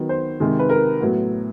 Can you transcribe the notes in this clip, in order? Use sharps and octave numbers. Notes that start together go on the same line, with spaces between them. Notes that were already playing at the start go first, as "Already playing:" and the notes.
Already playing: D#3 F#3 B3
C5
C3 D#3 G#3
B4
A#4
A2 F#3 B3